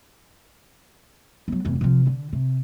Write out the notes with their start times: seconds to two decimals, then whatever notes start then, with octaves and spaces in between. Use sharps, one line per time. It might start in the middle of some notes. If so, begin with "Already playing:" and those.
1.48 F#3 B3
1.65 F1 E2
1.81 C3 F3
2.07 D3
2.33 C3